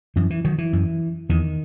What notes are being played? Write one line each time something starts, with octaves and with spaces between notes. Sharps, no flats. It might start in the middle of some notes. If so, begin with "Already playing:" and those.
F#2 E3
E3
D#3 F#3
E3
F#2
E2 D#3